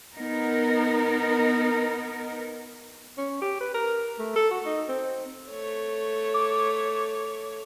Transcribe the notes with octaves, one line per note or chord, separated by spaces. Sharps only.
B3 D#4 A#4
C#4
G4
B4
A#4
A3
A4
F#4
D#4
C4
A3 C#5
D6